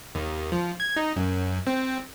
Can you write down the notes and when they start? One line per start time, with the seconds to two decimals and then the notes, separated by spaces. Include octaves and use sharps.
0.15 D#2
0.52 F3
0.80 G#6
0.96 D#4
1.16 F#2
1.67 C4